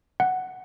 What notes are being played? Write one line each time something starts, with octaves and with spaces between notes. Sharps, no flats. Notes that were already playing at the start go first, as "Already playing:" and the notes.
F#5